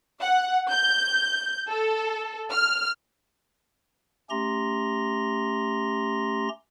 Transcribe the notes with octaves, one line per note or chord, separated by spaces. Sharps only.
F#5
G6
A4
F6
A3 C#4 G4 A#5 C6 A#6